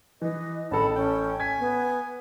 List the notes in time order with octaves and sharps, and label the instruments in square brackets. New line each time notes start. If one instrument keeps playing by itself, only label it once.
[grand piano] E3 [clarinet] B4 [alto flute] D#5
[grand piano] A1 A4 [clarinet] A5 [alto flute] B5
[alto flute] C#4 [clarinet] G5
[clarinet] G#5 [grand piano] G#6 B6
[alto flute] B3